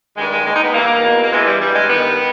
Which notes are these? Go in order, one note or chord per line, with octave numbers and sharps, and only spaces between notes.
G2 D#3 G#3
G#3
D#2 D#3 G#3
D#4
B3
G2 E3 A#3
E2 B2
A#3
G2 E3 G#3
G3
G2 E3 G3
G#3
G2 D#3 B3